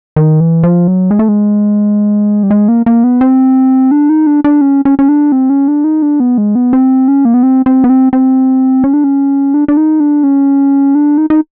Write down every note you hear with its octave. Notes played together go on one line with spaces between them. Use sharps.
D#3
E3
F3
F#3
G#3
A3
G#3
G3
G#3
A#3
A#3
B3
C4
D4
D#4
D4
D4
C#4
C#4
C#4
D4
C4
C#4
D4
D#4
D4
B3
G#3
B3
C4
C#4
A#3
B3
C4
C4
B3
C4
C4
C#4
D4
C#4
D4
D4
D#4
D4
C#4
D4
D#4
D#4